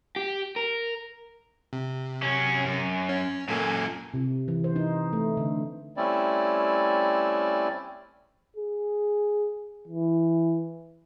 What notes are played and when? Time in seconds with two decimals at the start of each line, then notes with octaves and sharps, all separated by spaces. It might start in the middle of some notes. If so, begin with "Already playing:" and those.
0.16 G4
0.56 A#4
1.73 C3
2.22 F#3 C#4
2.65 F#2
3.09 C#4
3.49 F#2 A#2 A#3 A4 G#5
4.14 C3
4.48 E3
4.64 C5
4.76 D#4
5.13 A3
5.37 D3
5.97 G3 A3 C4 C#4 E4 D5
8.57 G#4
9.88 E3